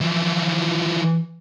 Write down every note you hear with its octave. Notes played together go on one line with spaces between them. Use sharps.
E3 F3